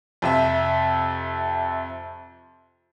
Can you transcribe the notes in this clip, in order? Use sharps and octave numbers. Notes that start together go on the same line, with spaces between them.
F2 C3 E5